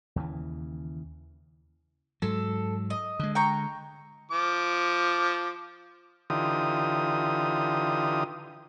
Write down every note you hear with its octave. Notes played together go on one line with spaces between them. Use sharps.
D#2 C#3 E3
G#2 F#3 A4
D#5
D3 G#3
G5 A#5 C#6
F3 D6
D3 E3 D#4 F4 G4 D#6